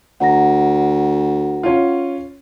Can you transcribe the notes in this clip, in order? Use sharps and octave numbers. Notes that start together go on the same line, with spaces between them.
D2 F#5 A#5 A#6
C#4 F4